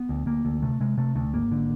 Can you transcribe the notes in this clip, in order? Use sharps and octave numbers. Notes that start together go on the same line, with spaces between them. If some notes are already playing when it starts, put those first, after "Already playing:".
Already playing: B3
D2
D2 A#3
D2
C3 A3
C3 G#3
C3 A3
D2 A3
G#1 A#3
D3